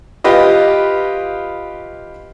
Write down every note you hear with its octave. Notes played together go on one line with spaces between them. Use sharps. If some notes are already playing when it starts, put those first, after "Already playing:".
F4 G4 B4 D#5